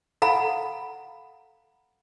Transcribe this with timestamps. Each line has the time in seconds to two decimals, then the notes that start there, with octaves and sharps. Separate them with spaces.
0.22 A4 F5 F#5 A#5 B5